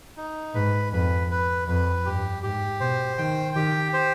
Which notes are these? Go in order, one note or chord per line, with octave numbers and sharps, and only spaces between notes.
D#4
G#2 B4
F2 B4
B4
F2 B4
G2 G4
G#2 G4
B2 C5
D#3 G5
D#3 G4
C5